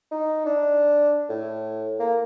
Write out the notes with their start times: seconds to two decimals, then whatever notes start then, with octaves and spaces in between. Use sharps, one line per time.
0.11 D#4
0.46 D4
1.29 A2
1.99 A#3